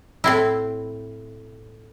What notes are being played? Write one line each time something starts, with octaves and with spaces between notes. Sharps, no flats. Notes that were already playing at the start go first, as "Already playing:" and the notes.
A2 C4 E4